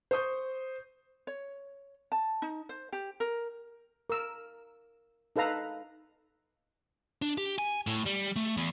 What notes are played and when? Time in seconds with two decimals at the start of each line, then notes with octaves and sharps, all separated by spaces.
0.11 C5 C#6 D#6 G6
1.27 C#5
2.12 A5
2.42 D#4
2.69 C5
2.92 G4
3.20 A#4
4.10 A#4 E6
5.36 D#4 A4 B4 F5 A#5
7.22 D4
7.38 G4
7.58 G#5
7.87 A2
8.06 G3
8.36 A3
8.57 E2